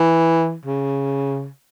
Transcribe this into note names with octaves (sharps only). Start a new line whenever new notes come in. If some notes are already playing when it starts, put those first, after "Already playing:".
Already playing: E3
C#3